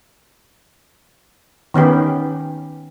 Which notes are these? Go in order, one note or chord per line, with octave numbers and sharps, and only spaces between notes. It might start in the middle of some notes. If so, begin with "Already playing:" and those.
D#3 B3 C#4 G4